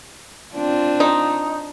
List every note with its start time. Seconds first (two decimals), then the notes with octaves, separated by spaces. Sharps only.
0.54 C4 D4 F4
1.00 D#4